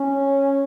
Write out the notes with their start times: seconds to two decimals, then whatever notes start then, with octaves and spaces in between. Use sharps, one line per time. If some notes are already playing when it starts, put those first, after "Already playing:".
Already playing: C#4